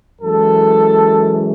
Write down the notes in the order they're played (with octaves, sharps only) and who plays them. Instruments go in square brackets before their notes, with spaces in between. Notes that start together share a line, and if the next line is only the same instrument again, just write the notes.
[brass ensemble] F#2 E3 G#3 A4